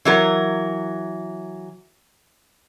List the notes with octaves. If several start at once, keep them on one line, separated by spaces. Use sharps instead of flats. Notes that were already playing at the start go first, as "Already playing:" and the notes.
E3 F#3 A#4